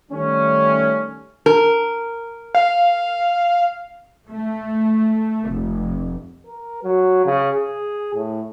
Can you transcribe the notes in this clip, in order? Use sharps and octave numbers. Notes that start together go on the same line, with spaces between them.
D#3 G3 A3 C#4
A#4
F5
A3
F1
A#4
F#3
C#3
G#4
A2